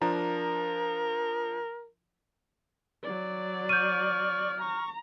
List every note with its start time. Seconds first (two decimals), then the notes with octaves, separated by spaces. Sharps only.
0.02 F3 D4 A#4 A#5
3.04 F#3 D5
3.69 C#6 F6 G6 D#7
4.61 A#5 C#6